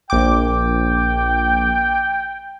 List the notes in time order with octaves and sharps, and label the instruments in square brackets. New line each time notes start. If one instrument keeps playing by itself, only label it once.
[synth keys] A#1 D6 [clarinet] G5